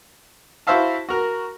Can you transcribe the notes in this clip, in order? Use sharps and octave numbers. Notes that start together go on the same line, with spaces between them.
E4 F#4 C5 E5 F5 A5
F#4 A#4